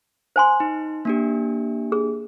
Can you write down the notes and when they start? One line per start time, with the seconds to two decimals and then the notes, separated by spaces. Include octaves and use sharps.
0.36 C5 G#5 C6
0.60 D#4
1.05 A#3 D4 G4
1.92 G#4